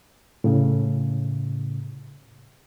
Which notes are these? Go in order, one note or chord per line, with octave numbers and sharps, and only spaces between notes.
A2 C#3